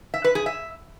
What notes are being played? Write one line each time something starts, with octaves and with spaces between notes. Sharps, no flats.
E5
B4
G#4
E5